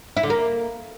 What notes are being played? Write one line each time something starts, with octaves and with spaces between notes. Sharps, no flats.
E4
D3
A#3